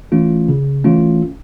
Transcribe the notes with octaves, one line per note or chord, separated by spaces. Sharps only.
E3 A3 C#4 F4
C#3
E3 A3 C#4 F4